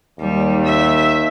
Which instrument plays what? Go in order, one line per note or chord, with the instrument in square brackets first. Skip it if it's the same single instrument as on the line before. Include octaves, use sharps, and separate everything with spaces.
[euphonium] D#2 [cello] G3
[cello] E5